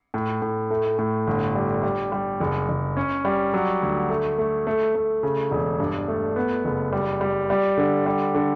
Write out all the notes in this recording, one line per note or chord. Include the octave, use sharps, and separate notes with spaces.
A2
A2
A3
A2
G1
G3
G3
G3
F#1
F#1
C#4
G3
F#3
D2
A3
A3
A3
A3
C#3
E1
G2
A3
B3
F#1
G3
G3
G3
D3
G3
D3